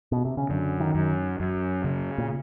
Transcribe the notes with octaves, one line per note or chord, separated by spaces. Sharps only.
B2
C3
C#3
F#2 D3
D#3
F#2
F#2
C#3
A#2